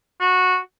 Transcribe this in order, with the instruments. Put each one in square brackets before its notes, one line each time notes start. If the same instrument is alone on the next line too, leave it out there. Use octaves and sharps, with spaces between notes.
[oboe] F#4